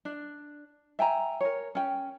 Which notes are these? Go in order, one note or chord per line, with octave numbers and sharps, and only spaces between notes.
D4
E5 G5 G#5 A#5
A#4 C#5
C#4 G5